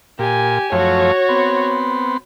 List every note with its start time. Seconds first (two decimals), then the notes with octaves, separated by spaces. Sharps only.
0.19 A#2 G4 G#5
0.72 F#2 F3 A3 F#4 C#5
1.29 B3 C4